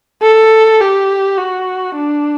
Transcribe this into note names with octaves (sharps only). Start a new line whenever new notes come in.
A4
G4
F#4
D4